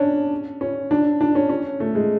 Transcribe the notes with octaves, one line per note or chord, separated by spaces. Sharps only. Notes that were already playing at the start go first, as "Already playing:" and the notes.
Already playing: C#4 D4
C#4
D4
D4
C#4
C#4
A3
G#3